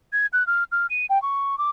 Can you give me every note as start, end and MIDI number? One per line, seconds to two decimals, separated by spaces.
0.13 0.26 92
0.33 0.46 90
0.47 0.64 89
0.72 0.87 89
0.90 1.06 99
1.10 1.21 79
1.22 1.58 85
1.58 1.70 86